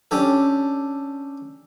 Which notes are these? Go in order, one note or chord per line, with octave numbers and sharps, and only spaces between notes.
C#4 D4 G4 A4